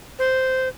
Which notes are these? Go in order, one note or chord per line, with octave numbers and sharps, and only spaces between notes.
C5